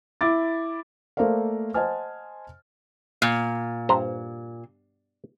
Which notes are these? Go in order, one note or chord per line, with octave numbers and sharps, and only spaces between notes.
E4 D6 A6
A3 A#3 A#4 C5 D5 F5
C5 D#5 F#5 G#5 A5 F6
A#2
G2 C5 A#5